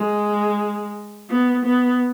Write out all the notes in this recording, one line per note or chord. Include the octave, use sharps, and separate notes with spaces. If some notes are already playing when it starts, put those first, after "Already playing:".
Already playing: G#3
B3
B3